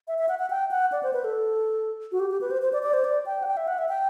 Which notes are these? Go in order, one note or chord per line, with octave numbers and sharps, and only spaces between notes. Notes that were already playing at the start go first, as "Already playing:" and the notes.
E5
E5
F#5
F#5
G5
F#5
D5
C5
B4
A4
F#4
G4
G4
B4
C5
C5
D5
D5
C5
D5
G5
F#5
G5
E5
F#5
E5
G5